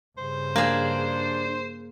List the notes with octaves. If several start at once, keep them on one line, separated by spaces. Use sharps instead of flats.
G2 C#3 C5
A#3 D4 G#4